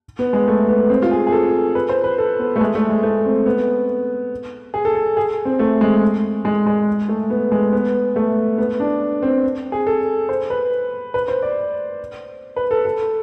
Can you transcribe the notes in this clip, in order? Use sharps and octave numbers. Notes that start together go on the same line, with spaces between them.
B3
G#3
A3
B3
C4
F4
G#4
G#4
A4
B4
C5
B4
A4
B3
A3
G#3
A3
G#3
A3
C4
B3
G#4
A4
A4
G#4
C4
A3
G#3
G#3
G#3
A3
B3
G#3
B3
A3
B3
D4
C4
G#4
A4
C5
B4
B4
C5
D5
B4
A4
A4